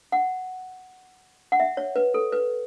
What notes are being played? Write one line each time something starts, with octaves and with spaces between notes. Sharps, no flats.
F#5
F#5
E5
C#5
B4
A4
B4